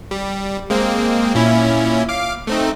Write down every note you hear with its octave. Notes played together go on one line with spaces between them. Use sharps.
G3
G#3 A#3 C4
A#2 C#4 E4
F5 D6
A3 C4 D#4